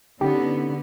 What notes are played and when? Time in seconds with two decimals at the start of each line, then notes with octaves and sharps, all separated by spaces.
0.21 D3 B3 C#4 D#4 G4